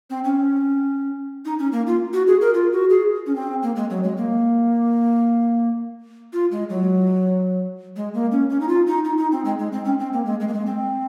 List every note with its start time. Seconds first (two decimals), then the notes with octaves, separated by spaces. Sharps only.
0.10 C4
0.24 C#4
1.45 D#4
1.59 C#4
1.72 A#3
1.87 F4
2.13 F#4
2.27 G#4
2.41 A#4
2.54 F4
2.72 F#4
2.90 G#4
3.26 C#4
3.35 C4
3.62 A#3
3.76 G#3
3.90 F#3
4.03 G#3
4.17 A#3
6.33 F4
6.51 G#3
6.69 F#3
7.96 G#3
8.14 A#3
8.32 C#4
8.50 C#4
8.60 D#4
8.68 F4
8.86 D#4
9.04 D#4
9.18 D#4
9.32 C4
9.45 G#3
9.58 G#3
9.72 C4
9.85 C#4
9.99 C4
10.13 A#3
10.25 G#3
10.40 G#3
10.48 A#3
10.53 G#3
10.66 C4